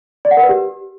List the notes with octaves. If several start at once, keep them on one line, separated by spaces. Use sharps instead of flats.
D5
F#5
A#4
B4
G4